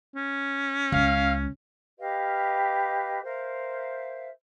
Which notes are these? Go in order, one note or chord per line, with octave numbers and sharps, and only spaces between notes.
C#4
C#2 F5
G4 B4 D#5 F5
A#4 C5 E5 F5